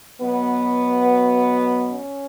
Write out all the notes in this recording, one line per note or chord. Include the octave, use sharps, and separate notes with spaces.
B2 F#3 B3
C#4